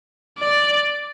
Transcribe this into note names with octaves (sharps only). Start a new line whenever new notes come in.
D5